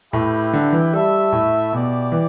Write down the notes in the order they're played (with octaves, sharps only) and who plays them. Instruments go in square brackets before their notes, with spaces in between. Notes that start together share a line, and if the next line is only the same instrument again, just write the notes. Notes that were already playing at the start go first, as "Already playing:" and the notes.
[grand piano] A2 [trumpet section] E4 G4 B4 E5 G5
[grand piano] D3
E3
[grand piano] G3 [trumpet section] A3 E4 A4 E5
[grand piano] A2
[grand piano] B2 [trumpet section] E4 G4 D5
[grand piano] E3